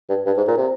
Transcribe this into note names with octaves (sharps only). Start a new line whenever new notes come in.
G2
G2
G#2
A#2
C3